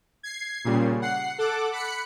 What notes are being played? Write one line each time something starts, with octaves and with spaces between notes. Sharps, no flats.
G#6 C7
A#2 C#3 G3
F#5 C7
A4 F#5 D6
B5 F#6 C#7